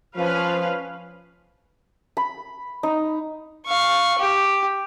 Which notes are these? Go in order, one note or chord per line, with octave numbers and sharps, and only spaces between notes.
F3 C#4 B4 F5
B5
D#4
F5 C#6
G4